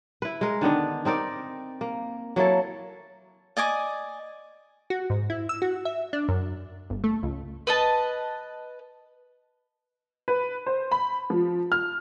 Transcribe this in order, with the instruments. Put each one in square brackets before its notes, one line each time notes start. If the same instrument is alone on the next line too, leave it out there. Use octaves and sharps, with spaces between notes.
[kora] E4 B4
G#3 A#4
D3 D#3 B3 D4
C4 D#4 A#4 D5
A#3
F#3 A#3 E4 A4
[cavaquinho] D5 D#5 G#5 D6
[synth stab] F#4
G#2
E4
E6
F#4
E5
D4
F#2
G1
A3
C#2
[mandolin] B4 D#5 A5
[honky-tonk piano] B4
C5
B5
F3
F6